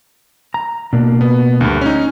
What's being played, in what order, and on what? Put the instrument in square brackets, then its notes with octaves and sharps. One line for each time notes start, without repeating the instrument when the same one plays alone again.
[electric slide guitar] A#5
[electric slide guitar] B2 A#3 [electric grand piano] D4
[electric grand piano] B3
D2 G2
C#4 D#4